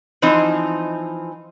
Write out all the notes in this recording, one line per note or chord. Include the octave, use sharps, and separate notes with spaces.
E3 F3 C4 D#4 C5